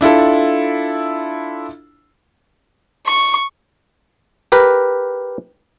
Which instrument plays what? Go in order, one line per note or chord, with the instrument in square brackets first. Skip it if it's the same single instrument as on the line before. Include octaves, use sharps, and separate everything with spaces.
[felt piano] D4 E4 F4 A4
[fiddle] C#6
[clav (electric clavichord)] G4 A#4 B4